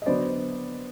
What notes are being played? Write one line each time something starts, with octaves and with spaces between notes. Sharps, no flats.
D#5
D3 F#3 B3 C5 D5